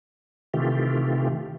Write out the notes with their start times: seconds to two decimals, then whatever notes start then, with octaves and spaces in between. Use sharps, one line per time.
0.54 C3 D#3 E3 A3 F4 G4